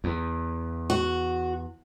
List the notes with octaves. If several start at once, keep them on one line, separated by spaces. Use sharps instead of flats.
E2
F#4